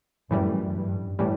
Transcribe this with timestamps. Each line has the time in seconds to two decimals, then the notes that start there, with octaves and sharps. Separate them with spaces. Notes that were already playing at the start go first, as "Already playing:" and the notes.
0.31 F#2 A2 E3 G3
0.75 G2
1.19 A2 E3 G3